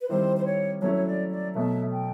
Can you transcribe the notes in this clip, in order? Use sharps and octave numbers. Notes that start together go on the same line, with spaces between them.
B4
D#3 G3 C4 E4 C5
C5
C#5
F#3 A3 C#4 E4 C#5
C#5
D5
D5
B2 F#3 A3 E5
G5